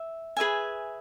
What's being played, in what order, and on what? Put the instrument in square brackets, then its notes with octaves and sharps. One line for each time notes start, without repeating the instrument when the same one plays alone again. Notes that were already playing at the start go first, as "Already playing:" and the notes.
Already playing: [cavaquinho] E5
G#4 B4 E5 G#5